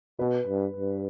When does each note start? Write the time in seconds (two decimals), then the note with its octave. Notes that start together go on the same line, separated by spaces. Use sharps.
0.19 B2 B4
0.47 G2
0.76 G2